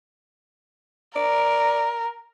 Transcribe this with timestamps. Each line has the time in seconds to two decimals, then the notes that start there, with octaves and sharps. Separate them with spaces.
1.16 A#4 D5